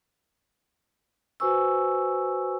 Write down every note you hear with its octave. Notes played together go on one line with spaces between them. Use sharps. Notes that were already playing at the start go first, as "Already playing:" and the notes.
F#4 B4 C5 G#5 C#6 E6